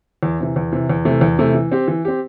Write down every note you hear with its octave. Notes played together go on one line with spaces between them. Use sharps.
E2
C3 E3
E2
C3 E3
E2
C3 E3 A3
E2
C3 E3 A3
E3
C4 G4
E3
C4 G4